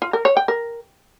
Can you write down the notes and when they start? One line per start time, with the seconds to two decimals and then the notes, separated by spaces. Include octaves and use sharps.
0.02 F4
0.13 A#4
0.25 C#5
0.37 G5
0.48 A#4